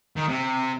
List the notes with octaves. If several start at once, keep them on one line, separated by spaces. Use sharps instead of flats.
D#3
C3